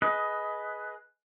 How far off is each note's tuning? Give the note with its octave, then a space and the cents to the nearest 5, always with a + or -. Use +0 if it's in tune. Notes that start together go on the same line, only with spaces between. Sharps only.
G#4 +20 B4 +0 D#5 +10